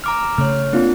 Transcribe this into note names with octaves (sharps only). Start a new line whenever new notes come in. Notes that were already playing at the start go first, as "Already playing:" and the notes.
A#5 D6 F6
C#3 A3 C#5 F6
A#3 C4 D4 F4